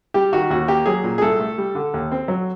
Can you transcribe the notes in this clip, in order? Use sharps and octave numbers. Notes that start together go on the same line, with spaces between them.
G3 G4
D#3 F#4
D#2 F#4
A#3 G4
F#3 G#4
A#2
G#4
C2 A4
A3
G3
D3
D#2
C4
F#3